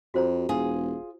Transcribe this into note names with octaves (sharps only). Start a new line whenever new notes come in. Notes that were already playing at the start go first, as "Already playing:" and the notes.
F2 F#4 C5 A#5
E1 F4 G#4